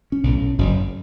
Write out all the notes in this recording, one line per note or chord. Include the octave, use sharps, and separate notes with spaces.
C#4
B1 A2
F#1 F#2 C#3